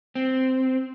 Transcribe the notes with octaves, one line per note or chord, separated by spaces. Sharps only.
C4